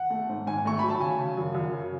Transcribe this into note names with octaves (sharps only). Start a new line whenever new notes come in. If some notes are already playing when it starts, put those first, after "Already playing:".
Already playing: F#5
A3
G#2
G#2 G#5
A3 C#6
F#3 B5
A5
C#3 G#5
C#3
F#2
F#2
C#3